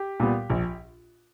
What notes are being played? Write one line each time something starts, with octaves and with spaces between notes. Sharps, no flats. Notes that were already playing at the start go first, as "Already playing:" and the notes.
Already playing: G4
A#2 G3 B3
A#1